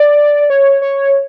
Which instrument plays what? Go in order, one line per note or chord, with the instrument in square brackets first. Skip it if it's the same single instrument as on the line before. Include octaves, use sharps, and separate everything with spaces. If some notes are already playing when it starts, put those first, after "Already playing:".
Already playing: [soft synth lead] D5
C#5
C#5